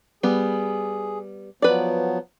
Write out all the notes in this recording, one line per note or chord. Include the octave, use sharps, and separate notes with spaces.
G3 B3 G#4
F3 F#3 B3 B4 D5